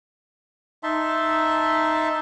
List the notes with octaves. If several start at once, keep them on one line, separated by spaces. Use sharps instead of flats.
D#4 E5 A5 C6